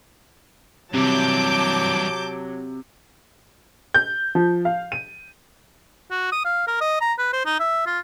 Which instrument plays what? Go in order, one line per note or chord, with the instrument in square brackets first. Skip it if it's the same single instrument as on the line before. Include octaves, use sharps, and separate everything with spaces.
[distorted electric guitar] G2 E3 [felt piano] C3 [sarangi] F#3 [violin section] A5 D6 G6
[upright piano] G6
F3
F5
D#7
[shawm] F#4
D#6
F5
A#4
D#5
A#5
B4
C5
D#4
E5
F4